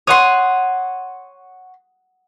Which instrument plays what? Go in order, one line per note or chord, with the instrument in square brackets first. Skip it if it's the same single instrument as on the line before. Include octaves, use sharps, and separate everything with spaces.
[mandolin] C#5 C6 [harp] F#5 D#6